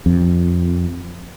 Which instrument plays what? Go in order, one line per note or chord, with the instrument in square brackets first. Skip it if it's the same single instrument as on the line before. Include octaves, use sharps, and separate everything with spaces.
[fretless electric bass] F2